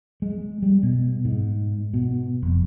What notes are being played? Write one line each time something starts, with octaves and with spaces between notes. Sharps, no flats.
G#3
G3
B2
G#2
B2
F1